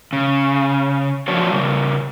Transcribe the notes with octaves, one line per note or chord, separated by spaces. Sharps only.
C#3
F3 D4 F4 F#4 C#5
C#3 G3